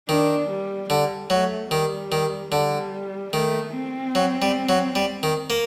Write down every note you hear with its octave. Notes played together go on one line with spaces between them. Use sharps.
D#3 D4
G3
D3 G3
F#3 A3
D#3 G3
D#3
D3 G3
D#3 A3
C4
F#3
G3
F#3
G3 C4
D#3
A#3